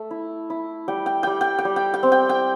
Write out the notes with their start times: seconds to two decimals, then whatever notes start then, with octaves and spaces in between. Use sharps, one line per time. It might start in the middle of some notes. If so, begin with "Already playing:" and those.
Already playing: A3
0.11 E4
0.50 E4
0.88 G3 G5
1.06 G5
1.23 G3 G5
1.41 G5
1.59 G5
1.65 G3
1.76 G5
1.94 G5
2.03 C4
2.12 G5
2.29 G5